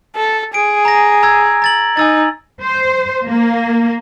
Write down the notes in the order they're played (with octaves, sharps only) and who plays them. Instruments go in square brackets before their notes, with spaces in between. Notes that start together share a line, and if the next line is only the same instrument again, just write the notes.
[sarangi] A4
[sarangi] G#4 [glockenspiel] D7
[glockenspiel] A#5 A#6
A#5 E6 G#6
A#5 A6 F#7
[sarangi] D#4 [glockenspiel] G#5 E6 A6
[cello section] C5
A#3